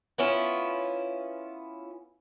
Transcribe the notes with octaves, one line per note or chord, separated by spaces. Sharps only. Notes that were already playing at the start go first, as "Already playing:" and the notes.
B3 C#4 E4 F4